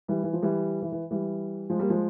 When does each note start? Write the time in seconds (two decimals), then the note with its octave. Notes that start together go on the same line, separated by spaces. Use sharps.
0.08 E3 G3
0.23 E3
0.33 F3
0.43 E3 G3
0.82 E3
0.92 E3
1.11 E3 G3
1.70 F3 G#3
1.79 G3 A#3
1.90 F3 G#3